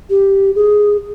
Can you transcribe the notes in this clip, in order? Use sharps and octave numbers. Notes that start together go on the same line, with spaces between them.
G4
G#4